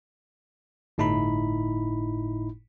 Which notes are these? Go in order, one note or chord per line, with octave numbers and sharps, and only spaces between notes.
G1 A2 D#4 E4 B5